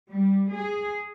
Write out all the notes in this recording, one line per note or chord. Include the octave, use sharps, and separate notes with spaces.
G3
G#4